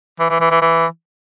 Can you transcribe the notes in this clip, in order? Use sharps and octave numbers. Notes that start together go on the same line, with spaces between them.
E3
E3
E3
E3
E3